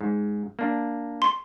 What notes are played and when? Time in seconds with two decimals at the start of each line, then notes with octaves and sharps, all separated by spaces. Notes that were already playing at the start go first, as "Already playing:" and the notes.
0.01 G#2
0.59 A#3 D4
1.22 C6